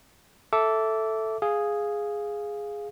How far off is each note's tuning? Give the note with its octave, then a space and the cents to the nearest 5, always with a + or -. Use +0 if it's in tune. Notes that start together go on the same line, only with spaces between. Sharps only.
A4 +0 E5 +0 D6 -20
G#4 +0 F5 +0